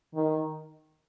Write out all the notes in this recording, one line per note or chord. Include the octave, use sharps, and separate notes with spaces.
D#3